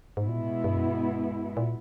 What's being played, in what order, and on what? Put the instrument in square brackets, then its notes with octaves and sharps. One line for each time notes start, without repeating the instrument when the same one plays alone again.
[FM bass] G#2 [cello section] B2 G#3 B3 E4
[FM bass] A#2
A2
G2
F#2
G2
A#2